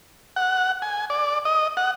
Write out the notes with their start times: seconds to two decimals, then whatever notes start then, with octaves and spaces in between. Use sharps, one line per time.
0.36 F#5
0.82 G#5
1.10 D5
1.45 D#5
1.77 F#5